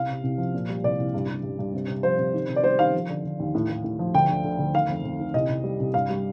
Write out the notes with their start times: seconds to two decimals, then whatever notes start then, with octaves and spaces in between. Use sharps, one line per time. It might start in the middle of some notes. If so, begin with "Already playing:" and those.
Already playing: C2 F5
0.09 C3
0.23 C2
0.38 F3
0.54 A#2
0.69 G3
0.84 C2 D5
0.99 C2
1.14 G2
1.28 G2
1.43 G2
1.59 G2
1.73 C3
1.88 C3
2.03 F3 C5
2.18 C3
2.34 D#3
2.48 C3
2.56 D5
2.64 G3 C5
2.79 D#3 F5
2.93 F3
3.09 D3
3.24 D3
3.39 D#2
3.55 A2
3.69 A2
3.84 A2
3.99 F3
4.14 D2 G5
4.29 D3
4.44 D3
4.59 D2
4.74 D#3 F5
4.89 F2
5.04 F2
5.19 D#3
5.34 C2 D#5
5.49 C2
5.64 G3
5.80 C2
5.94 G2 F5
6.10 G3